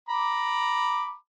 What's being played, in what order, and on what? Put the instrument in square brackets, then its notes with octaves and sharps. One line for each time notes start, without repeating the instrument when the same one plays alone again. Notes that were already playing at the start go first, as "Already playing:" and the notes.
[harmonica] A#5 B5 D6